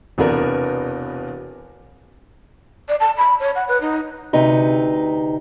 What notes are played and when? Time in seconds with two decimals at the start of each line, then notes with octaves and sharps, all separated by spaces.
0.18 E1 E2 C3 B3 D4 A#4
2.89 D5
3.00 A5
3.18 B5
3.40 C#5
3.56 F#5
3.68 B4
3.81 D#4
4.33 D2 C3 D#4 B4